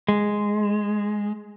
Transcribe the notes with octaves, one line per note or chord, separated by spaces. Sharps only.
G#3